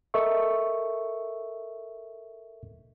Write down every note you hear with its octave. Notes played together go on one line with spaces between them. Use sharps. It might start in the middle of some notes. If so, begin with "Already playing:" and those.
A4 A#4 D#5 E5 C#6